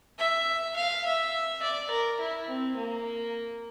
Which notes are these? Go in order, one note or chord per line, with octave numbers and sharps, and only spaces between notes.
E5
F5
E5
D5
A#4
E4
C4
A#3